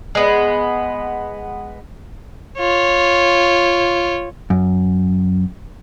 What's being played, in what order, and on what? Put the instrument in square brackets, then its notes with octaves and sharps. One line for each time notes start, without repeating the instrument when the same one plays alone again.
[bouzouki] G#3 B3
[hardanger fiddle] F4 C#5
[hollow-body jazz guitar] F#2